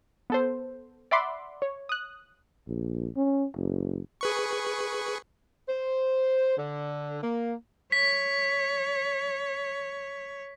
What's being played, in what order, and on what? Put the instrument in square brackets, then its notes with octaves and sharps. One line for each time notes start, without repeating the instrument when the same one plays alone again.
[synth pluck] B3 A4 C5
D5 E5 F#5 B5 C6 D6
C#5
D#6 F#6
[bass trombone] A#1
C#4
F#1
[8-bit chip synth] G#4 B4 C#6
[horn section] C5
D3
A#3
[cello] C#5 [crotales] B6